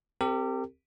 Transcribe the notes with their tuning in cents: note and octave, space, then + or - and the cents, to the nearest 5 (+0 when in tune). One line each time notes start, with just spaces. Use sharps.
C4 +0 G4 +0 A#4 -45